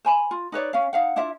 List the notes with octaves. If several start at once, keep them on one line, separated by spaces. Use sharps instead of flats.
C5 G#5 B5
F4
D#4 B4 C#5 D5
C#4 F5
D#4 F5 F#5
D4 E4 F4 E5